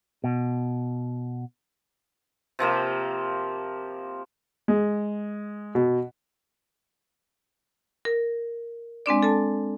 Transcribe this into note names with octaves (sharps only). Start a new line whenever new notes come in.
B2
C3 F3 A#3 G4
G#3
B2
A#4
G#3 C4 D4 D5
A4 A5